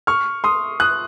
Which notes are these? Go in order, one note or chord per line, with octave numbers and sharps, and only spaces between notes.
C#6 F6
C6 D#6
D#6 F#6